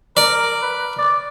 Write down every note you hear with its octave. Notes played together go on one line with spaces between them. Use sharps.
A#4 D5
B4
D5